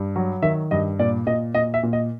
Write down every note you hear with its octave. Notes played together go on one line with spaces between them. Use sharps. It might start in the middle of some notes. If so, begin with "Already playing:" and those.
Already playing: G2
F#3
D#3 E5
G2 D#5
A#2 D5
A#2 D#5
A#2 D#5
E5
A#2
D#5